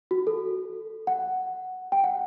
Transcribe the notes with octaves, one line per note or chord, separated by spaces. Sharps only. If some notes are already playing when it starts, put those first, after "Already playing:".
F#4
A4
F#5
G5
F#5